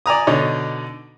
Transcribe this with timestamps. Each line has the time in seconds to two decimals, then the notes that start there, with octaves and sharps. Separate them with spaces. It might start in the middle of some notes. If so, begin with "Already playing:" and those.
0.06 D5 G#5 A#5 D#6
0.27 B2 D3 D#4 C#5 D5